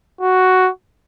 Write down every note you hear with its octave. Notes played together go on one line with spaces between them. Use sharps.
F#4